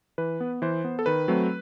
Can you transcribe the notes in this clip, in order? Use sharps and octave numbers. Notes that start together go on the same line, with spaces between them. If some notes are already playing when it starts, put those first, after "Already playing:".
E3 B4
B3
E3 C5
B3
A4
D#3 B4
F#3 A3 C4